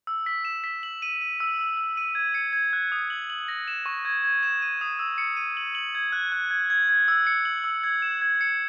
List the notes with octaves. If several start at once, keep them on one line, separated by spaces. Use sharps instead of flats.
E6
B6
E7
B6
F#7
D#7
D#7
E6
E6
E6
D#7
G#6
C#7
G#6
F#6
D#6
F#7
F#7
A#6
E7
C#6
G#6
G#6
E7
D#7
D#6
E6
C#7
D#7
F#7
F#7
G#6
F#6
F#6
G#6
G#6
G#6
E6
C#7
F#7
E6
G#6
E7
G#6
C#7